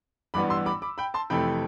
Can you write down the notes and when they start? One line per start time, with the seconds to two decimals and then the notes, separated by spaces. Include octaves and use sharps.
0.34 A1 G2 E3 G3 B3 B5 D6
0.50 C6 E6
0.66 B5 D6
0.82 B5 D6
0.98 G5 B5
1.14 A5 C6
1.30 F2 C3 E3 A3 G5 B5